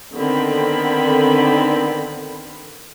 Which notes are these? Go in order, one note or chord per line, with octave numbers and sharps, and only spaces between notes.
D3 D#3 B3 C4 B5